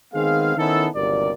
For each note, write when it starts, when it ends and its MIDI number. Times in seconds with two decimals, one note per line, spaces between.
0.14 0.53 51
0.14 0.53 56
0.14 0.53 59
0.14 0.53 60
0.14 0.53 68
0.14 0.53 77
0.57 0.88 51
0.57 0.88 59
0.57 0.88 61
0.57 0.88 63
0.57 0.88 64
0.57 0.88 69
0.95 1.31 31
0.95 1.31 39
0.95 1.31 48
0.95 1.31 54
0.95 1.31 70
0.95 1.31 74